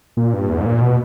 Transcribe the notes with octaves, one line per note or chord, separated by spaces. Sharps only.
A#2
G2
E2
G#2
A#2
B2